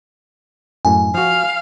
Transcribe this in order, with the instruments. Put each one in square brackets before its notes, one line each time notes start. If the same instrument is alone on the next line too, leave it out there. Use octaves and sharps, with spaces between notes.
[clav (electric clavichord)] F#2 A2 [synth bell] G#5
[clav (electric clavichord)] F3 F#4 [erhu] F5